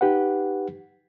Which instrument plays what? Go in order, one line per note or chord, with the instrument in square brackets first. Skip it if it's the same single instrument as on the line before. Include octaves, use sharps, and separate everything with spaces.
[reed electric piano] D#4 G4 B4 F#5